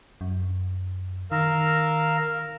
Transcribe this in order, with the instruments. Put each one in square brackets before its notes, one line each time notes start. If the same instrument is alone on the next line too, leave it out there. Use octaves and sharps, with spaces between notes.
[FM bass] F#2
[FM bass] D#3 [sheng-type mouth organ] A#4 F5 E6